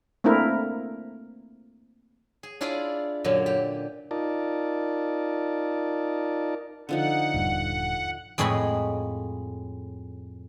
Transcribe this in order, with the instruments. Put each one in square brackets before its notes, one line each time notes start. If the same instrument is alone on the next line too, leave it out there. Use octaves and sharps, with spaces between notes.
[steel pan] A3 A#3 C4 D4 E4 A#4
[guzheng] G#4
D4 E4 F4 G#4 D5
F#2 A#2 D3 F#3
G4
[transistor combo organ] D#4 F4 A#4 D5 A5
[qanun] D3 F3 D#4 [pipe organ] F#5
[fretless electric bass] D#1 G2
[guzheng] F2 A2 G#3 C#5 D#5 B5